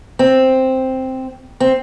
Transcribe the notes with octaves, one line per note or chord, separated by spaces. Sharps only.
C4
C4